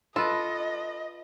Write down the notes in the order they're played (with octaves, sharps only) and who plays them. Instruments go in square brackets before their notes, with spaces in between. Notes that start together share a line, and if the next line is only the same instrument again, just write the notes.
[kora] F4 B4 [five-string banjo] A4 [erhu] D#5